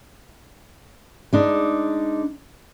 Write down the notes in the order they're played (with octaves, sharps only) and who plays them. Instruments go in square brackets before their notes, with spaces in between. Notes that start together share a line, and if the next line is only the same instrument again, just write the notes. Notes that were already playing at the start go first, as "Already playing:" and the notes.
[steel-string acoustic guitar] G#3 D4 D#4